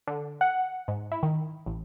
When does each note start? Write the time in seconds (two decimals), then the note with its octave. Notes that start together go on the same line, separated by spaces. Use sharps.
0.07 D3
0.41 F#5
0.88 G#2
1.12 E4
1.23 D#3
1.66 A1